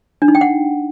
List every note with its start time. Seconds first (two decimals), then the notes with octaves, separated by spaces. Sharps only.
0.22 D4
0.28 D#4
0.35 G5
0.41 F#5